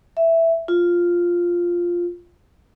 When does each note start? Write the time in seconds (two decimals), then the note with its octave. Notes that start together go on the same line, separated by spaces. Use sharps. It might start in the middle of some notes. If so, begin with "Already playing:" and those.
0.17 E5
0.68 F4